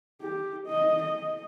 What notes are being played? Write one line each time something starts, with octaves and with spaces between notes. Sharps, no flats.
G4
D#5
D#5